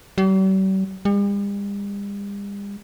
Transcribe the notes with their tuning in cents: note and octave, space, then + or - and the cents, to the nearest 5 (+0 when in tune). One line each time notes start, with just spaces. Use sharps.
G3 -45
G3 +45